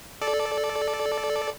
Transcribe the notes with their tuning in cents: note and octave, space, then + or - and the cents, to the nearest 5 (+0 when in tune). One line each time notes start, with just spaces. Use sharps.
A4 -15 D5 +0